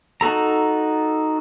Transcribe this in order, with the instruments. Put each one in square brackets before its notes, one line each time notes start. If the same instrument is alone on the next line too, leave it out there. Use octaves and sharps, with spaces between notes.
[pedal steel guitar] D#4 F#4 A4 A#5